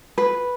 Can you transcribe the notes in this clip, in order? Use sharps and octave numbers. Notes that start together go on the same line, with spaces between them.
B4